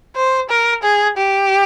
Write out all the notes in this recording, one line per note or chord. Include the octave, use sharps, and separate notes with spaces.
C5
A#4
G#4
G4